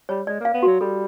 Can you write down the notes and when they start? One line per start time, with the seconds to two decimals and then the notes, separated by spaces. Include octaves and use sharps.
0.09 G3 C#5
0.27 G#3 D5
0.40 A#3
0.45 F5
0.54 B3
0.63 F#3 F#4
0.81 G3 A4